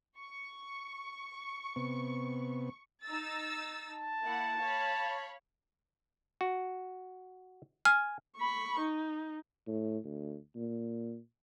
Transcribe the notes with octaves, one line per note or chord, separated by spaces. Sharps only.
C#6
C3 B3
D#4 E6 A6
A5
A#3 E4 F#5
C#5 F5 B5
F#4
G#5 F6
B5 C#6
D#4
A2
D2
A#2